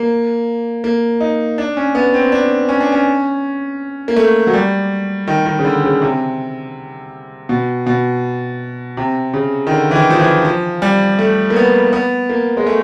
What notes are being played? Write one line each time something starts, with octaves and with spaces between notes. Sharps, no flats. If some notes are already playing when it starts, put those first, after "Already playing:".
Already playing: A#3
A#3
D#4
D4
C#4
B3
C4
D4
C#4
D4
C#4
A#3
A3
F#3
G3
D#3
D#3
C#3
D3
C#3
C3
B2
B2
C3
C#3
D#3
D3
E3
D#3
F3
E3
F3
G3
A3
A#3
B3
B3
A#3
G#3
A3